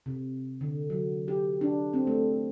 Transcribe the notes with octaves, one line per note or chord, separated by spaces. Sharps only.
C3
D3
F#3
G4
D4
C4
A3